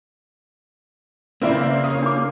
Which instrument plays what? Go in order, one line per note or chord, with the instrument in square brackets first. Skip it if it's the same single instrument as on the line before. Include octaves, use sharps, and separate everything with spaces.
[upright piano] C#3 A#4 B4 [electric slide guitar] A#3 [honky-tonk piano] C4 E4 D5
[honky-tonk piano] C#5 F5 D#6
[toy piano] D4 D6